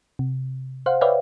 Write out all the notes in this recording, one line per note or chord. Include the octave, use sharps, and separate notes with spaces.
C3
C5 F5 F#5
B4 C#5 D5 E5 F5 G5